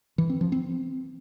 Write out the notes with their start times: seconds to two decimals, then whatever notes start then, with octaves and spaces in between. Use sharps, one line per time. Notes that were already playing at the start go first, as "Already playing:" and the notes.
0.18 E3
0.30 C4
0.41 F3
0.52 C4